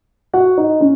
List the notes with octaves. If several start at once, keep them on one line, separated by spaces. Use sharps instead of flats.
F#4 F#5
D#4 D#5
C#4